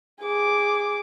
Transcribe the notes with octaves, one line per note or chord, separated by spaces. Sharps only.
G#4 D6